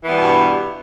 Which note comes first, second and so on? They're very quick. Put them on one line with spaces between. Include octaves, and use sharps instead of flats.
E3 B3 G3 B2 G2